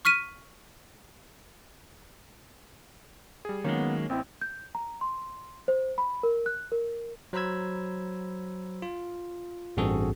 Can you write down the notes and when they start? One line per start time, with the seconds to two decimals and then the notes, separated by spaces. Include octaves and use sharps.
0.05 C#6 F6 B6 D#7
3.45 G3 G#4
3.64 D#3 F#3 G#3 A#3 B3 C#4
4.09 A1 C4 E4
4.41 G6
4.75 A#5
5.01 C6
5.68 C5
5.98 B5
6.23 A#4
6.46 F#6
6.72 A#4
7.33 F#3 C5 A#5 B5 E6 G#6
8.82 F4
9.77 A1 G2 C4 F#4 G#4 A4